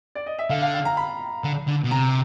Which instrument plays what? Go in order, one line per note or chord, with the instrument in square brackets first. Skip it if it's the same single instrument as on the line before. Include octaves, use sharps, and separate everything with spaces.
[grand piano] D5
D#5
E5
[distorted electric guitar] D3 [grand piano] F5
[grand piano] F5
F5
A#5
B5
[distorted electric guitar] D3
D3
B2
[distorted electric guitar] C3 [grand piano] A#5